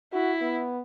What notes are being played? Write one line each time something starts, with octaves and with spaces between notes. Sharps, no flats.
E4 F#4
B3